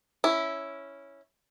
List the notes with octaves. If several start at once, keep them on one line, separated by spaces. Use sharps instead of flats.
C#4 E4